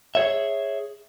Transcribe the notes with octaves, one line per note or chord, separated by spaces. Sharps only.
G#4 C#5 E5